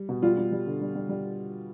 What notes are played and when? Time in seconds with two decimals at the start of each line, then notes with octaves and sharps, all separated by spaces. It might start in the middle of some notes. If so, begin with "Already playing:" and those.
Already playing: G3
0.09 B2
0.22 G3 F4
0.37 G3
0.52 G3
0.66 D3
0.81 G3
0.96 G3
1.09 G3